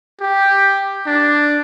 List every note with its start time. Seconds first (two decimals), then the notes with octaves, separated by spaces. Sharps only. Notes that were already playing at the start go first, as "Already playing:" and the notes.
0.21 G4
1.07 D4